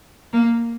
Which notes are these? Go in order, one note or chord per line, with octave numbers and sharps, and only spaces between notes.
A#3